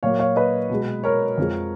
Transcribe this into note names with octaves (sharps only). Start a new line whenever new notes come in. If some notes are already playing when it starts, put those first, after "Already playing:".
A#2 F#3 A#3 C#5 F5
C#5 F5
B4 D#5
B2 G#3
A#4 C#5
F2 F3 G#3